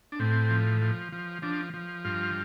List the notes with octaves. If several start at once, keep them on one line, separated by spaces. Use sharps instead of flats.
D4
A2 C4
F3
F3
F3
F3 D4
F3
G2 F4